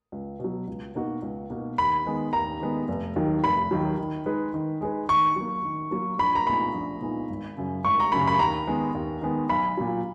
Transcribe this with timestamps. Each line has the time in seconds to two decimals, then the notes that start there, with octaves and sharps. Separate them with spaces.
0.12 C#2
0.40 B2 F#3
0.68 C#2
0.95 B2 A#3 D#4 F#4
1.22 C#2
1.50 B2 A#3 D#4 F#4
1.78 D#2 B5
2.05 D#3 G#3 B3
2.33 D#2 A#5
2.60 D#3 G#3 B3
2.88 F1
3.16 D#2 D#3 F#3
3.43 F1 B5
3.71 D#2 D#3 F#3
3.99 D#3
4.26 G#3 D#4 G#4 B4
4.54 D#3
4.81 G#3 D#4 G#4 B4
5.08 D#3 C#6
5.36 F#3 A#3
5.64 D#3
5.91 F#3 A#3
6.18 A#1 B5
6.35 A#5
6.46 A#2 G#3 B3 D#4 B5
6.74 A#1
7.01 A#2 G#3 B3 D#4
7.30 G#1
7.57 F#2 C#3
7.84 G#1 C#6
8.00 A#5
8.12 F#2 C#3 B5
8.28 B5
8.39 D#2 A#5
8.67 D#3 G#3 B3
8.95 D#2
9.21 D#3 G#3 B3
9.49 B1 B5
9.77 A#2 F#3